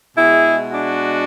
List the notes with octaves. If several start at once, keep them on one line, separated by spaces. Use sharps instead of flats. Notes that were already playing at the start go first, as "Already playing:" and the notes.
B2 G#3 E4 G#4
D4 F#4